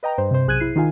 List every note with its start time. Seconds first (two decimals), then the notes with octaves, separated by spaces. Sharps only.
0.03 B4 D#5 G5 A#5
0.18 G2 C5
0.31 C3 C5
0.47 B1 G#4 F#6 G#6 D#7
0.60 E4 C7
0.76 D#3 D#4 F4 F5 G#5